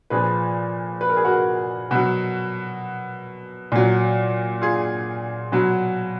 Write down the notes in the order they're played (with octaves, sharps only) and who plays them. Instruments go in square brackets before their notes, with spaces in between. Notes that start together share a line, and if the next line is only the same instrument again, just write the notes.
[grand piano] A#2 F3 G#4 B4
B4
A#4
G#4
F#4 A#4
B2 F#3
A#2 F#3
F4 G#4
B2 F#3